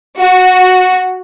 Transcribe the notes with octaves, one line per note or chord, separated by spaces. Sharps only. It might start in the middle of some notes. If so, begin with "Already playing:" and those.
F#4